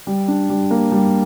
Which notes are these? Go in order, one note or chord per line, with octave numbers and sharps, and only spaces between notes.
G3
D4
G3
A#3
G3